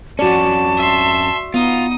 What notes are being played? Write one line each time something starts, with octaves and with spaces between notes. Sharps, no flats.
F2 C#4 F#4 D5 A5
E5 C6
B3 D#4 F4 D#6